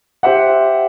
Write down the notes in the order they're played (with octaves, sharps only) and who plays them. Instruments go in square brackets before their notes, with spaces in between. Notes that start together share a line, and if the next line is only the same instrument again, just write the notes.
[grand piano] G4 C5 E5 F#5